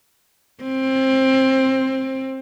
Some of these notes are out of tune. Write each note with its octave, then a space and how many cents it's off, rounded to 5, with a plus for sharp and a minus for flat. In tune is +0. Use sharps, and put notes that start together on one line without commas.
C4 +20